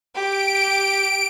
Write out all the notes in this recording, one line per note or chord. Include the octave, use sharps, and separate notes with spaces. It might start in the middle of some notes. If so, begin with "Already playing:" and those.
G4 D7